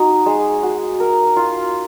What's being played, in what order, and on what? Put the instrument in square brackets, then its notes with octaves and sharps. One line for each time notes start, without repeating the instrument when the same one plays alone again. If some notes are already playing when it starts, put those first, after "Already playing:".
Already playing: [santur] D#4 F#4
G#3
F#4
A#4
F4